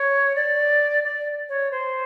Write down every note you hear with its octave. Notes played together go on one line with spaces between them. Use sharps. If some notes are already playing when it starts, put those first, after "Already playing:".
Already playing: C#5
D5
D5
C#5
C5